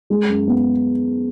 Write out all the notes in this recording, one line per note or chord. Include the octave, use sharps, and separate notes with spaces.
G#3
F#2
B3